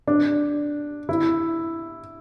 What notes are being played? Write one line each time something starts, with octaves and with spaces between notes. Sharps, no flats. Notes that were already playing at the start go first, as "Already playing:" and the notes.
D4
E4